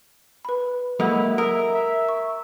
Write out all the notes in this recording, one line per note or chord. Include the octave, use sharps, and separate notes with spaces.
B4 B5
F#3 G#3 A#3 E4 A4 F#5
A#4 E5 D#6
E5
C#6